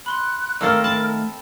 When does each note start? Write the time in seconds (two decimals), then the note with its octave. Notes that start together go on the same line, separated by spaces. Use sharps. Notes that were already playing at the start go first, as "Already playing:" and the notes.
0.06 B5 C6 F#6
0.61 D#3 A3 A#3 C4 A4 A#4 F5 E6
0.84 A5 B5